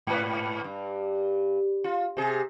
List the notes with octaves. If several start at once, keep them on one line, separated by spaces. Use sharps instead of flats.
G#2 B4
G2
F4
C3 G#4